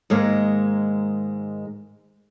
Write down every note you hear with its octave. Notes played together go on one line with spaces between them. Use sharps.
G#2 D#3 G#3 A#3